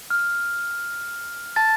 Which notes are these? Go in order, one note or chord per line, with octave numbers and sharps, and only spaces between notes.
F6
A5 A6